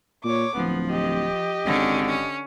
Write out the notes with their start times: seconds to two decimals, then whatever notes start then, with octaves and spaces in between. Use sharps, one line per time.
0.24 A#2 C#5 D6
0.55 D1 F3 B3
0.89 G4 D#5
1.65 G#1 D3 C#4
2.06 C#4